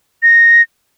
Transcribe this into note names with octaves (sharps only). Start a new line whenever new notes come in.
A#6